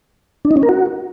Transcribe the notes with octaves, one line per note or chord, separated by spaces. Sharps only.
D4
D#4
C#4
A#4
F#4